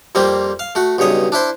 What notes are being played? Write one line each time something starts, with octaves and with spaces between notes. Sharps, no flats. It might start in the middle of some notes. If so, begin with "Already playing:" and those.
F2 G3 A#3 C4 F4
F5
A3 F#4
B1 G2 C#3 C#5 D#5
D4 E4 C5